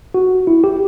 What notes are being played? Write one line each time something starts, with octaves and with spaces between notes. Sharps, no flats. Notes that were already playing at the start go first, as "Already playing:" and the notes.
F#4
E4
G4